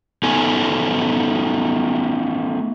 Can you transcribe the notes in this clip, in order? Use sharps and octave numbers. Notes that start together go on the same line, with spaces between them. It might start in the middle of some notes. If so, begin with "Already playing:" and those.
A3 B3 D#4 G#5